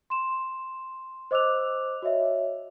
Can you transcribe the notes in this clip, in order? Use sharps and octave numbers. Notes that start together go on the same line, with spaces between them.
C6 E7
C5 D#5 D6 E6 F#6 F7
F#4 C#5 D#5 E5